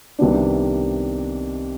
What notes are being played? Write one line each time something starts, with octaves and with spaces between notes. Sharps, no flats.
C2 C3 D#3 B3 D4